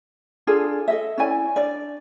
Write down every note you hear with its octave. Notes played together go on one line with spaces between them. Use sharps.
D4 F4 G#4 A4
A4 D#5 E5
C#4 E4 D5 G#5
D4 D5